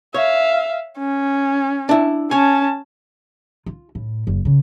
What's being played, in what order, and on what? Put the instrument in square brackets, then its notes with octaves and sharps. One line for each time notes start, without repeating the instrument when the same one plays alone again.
[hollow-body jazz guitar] C#5 [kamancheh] E5 F5
[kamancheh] C#4
[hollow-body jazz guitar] D4 E4
[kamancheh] C#4 A5 [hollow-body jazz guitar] C#5 G#5
[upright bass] F4
A2
F#1
C#3